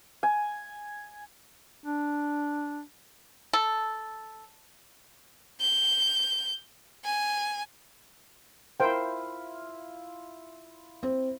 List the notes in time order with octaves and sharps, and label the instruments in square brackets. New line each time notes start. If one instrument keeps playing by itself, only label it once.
[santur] G#5
[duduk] D4
[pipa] A4
[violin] G6
G#5
[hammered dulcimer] E4 F4 [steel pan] A#4 C5 G5
[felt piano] C4